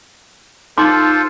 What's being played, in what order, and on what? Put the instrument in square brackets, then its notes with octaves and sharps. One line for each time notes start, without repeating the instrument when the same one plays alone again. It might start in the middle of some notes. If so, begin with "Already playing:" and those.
[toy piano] D#4 C6 D6 [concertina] F4 A4 C5